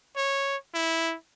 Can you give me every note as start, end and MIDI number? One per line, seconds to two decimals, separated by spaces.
0.16 0.57 73
0.75 1.15 64